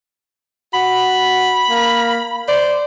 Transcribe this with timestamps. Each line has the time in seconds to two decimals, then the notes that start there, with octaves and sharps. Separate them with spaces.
0.74 F#4 B5
1.70 A#3
2.48 C5 D5